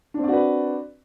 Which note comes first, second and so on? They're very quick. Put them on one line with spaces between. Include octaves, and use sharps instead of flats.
D4 C4 D5 F#4 B4